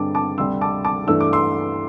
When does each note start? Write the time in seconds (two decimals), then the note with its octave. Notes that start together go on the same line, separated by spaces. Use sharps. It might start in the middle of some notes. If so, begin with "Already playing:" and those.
Already playing: G2 D3 G3 C4 A5 D6
0.15 A5 D6
0.38 D2 C3 G3 D4 C6 E6
0.61 A5 D6
0.85 A5 D6
1.07 G2 E3 A3 D4 E6
1.20 D6
1.33 C6 E6